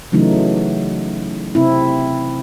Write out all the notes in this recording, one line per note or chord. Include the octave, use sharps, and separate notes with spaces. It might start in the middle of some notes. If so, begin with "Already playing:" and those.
C#3 E3 F#3 A3 D#4
C3 C4 E4